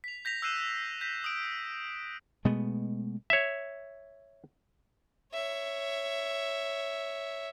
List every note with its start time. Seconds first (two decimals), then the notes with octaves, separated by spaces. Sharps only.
0.04 B6 F7
0.25 G6 A#6 B6 F7
0.42 E6 F#6 G6 C7 D#7 E7
1.01 G6 A#6 B6
1.24 D#6 D7
2.45 B2 G#3 A3 B3
3.30 C#5 E5
5.33 C#5 E5